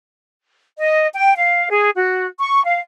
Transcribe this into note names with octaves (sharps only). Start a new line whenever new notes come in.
D#5
G5
F5
G#4
F#4
C#6
F5